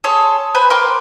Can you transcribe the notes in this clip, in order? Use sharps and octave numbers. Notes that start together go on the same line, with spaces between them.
G#4 A4 C#5 C6
B4 C5 G#5 B5
A#4 G5 C6 D6